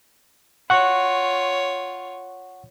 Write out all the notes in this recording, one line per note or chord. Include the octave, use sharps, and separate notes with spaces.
F4 C#5 F#5 C#6